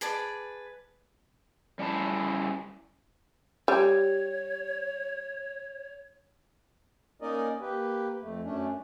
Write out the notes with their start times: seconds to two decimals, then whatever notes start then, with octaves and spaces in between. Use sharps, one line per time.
0.01 G#4 B4 D5 A5
1.79 G3 C#4 E4 A5
3.68 G3 C#5
7.21 A#3 C#4 D#4 A#4 D5 D#5
7.61 A#3 G4 B4
8.21 F2 A3
8.44 F#2 A3 C#4 D4